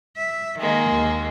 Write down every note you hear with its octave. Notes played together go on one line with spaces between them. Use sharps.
E5
D#3 G#3 A#3
D#2